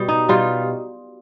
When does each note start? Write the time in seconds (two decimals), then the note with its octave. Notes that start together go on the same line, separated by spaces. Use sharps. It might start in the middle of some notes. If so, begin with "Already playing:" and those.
Already playing: B2 G3
0.08 D#4
0.29 B2 G3 F4